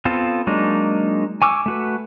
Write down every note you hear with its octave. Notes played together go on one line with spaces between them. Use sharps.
B3 C4 F4 A4
F#3 G#3 A#3 D4 D#4
G#5 C#6 D6 E6
A3 F#4 B4